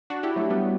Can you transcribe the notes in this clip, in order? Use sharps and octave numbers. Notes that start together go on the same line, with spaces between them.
D4 F#4
E4 G4
F#3 A3
G3 B3